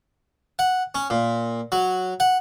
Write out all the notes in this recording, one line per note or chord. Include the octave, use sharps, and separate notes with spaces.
F#5
C#4
A#2
F#3
F#5